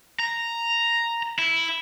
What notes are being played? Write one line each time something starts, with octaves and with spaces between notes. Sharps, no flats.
A#5
E4